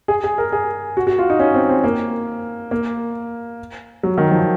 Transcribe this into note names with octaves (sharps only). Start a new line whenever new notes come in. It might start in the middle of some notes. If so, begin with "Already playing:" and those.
G#4
G#4
A#4
G#4
F#4
F#4
F4
D#4
C#4
C4
C4
A#3
A#3
F#3
D#3
F3